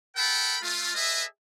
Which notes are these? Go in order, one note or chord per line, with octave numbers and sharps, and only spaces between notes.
A4 A#4 F#5 G5 A5 B5
A3 F4
G#4 A4 B4 D#5 E5